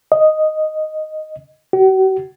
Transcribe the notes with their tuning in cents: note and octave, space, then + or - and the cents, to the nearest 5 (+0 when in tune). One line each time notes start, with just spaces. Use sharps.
D#5 +0
F#4 +45